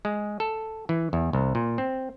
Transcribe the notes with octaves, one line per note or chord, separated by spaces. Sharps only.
G#3
A4
E3
E2
C2
A#2
C4